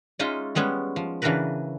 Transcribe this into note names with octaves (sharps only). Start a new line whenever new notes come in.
G#3 C#4 D#4 F4 D#5 E5
G3 G#3 B3 C#4
F3
C#3 E3 D4 F#4 A#4 B4